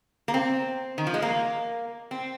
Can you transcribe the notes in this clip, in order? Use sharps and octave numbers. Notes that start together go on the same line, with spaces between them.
A#3
C4
D#3
F3
G#3
A#3
C4